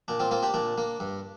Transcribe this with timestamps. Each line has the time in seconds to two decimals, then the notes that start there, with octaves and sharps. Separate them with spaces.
0.08 A#2 D4
0.20 C4 F4
0.31 A#3 C4 F4
0.43 D4 G4
0.54 A#2 D4
0.78 A#3
1.00 G2